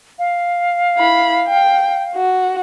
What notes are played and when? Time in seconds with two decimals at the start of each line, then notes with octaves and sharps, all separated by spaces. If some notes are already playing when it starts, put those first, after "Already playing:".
0.19 F5
0.97 E4 B5
1.47 G5
2.16 F#4